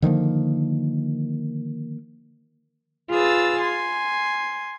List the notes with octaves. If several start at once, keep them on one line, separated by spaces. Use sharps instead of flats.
D3 D#3 F3 A#3
F4 G#4 B4 E6 A6
G#5 C6